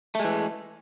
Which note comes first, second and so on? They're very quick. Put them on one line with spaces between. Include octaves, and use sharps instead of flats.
A3 G#3 E3